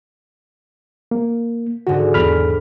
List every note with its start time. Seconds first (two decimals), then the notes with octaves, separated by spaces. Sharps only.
1.11 A#3
1.87 G#2 D3 F#4
2.14 E2 B5 F6